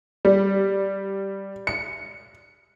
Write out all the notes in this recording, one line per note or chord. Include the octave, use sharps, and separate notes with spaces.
G3
C#7